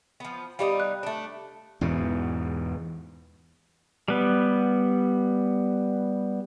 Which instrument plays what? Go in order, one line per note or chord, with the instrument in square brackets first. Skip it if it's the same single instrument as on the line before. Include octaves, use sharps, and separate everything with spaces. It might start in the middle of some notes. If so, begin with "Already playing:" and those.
[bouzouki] F3 B3
[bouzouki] G3 B3 D#4 [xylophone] G4 F5
[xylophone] F#6
[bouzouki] A3 D4
[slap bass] E2 G#2 B2
[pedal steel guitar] G3 B3